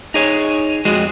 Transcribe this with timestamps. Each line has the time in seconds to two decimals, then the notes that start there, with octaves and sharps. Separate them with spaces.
0.14 D#4 G#4 C#5
0.85 F2 G#3 F#4 G#4